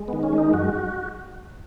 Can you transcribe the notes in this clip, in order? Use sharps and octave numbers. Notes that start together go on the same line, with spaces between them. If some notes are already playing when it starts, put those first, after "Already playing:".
Already playing: G#3
D#3 B3
C#4
G#3
D#4
F#2 F#4